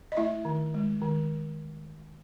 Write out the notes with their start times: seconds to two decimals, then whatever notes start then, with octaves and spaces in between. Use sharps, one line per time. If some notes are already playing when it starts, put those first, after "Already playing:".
0.12 D#5
0.17 A3 E4 E5
0.45 D#3
0.74 G#3
1.02 D#3